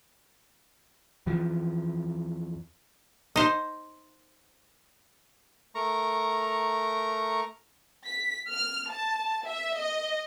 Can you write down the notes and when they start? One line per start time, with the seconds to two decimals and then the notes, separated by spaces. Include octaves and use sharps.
1.26 E2 E3 F3
3.36 D#4 C5
5.75 A3 A#4 A#5 C#6
8.07 B6
8.51 F6
8.90 A5
9.46 E5
9.79 D#5